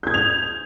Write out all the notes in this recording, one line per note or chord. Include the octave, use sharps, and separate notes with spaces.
D#6 G6 G#6 F7